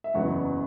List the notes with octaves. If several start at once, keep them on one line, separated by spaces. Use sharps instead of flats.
E5
F#1 E2 C#3 F#3 B3 F#5